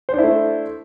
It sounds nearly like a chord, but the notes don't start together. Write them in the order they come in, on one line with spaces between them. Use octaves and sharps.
C5 D4 E4 A3